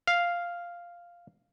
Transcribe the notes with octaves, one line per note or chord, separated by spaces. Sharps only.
F5